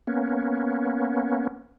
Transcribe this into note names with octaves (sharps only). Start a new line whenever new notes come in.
A#3 B3 C#4